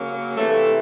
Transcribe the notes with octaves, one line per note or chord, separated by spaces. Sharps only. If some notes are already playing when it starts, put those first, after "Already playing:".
Already playing: C#3 F#3 A#3
C3 E3 A3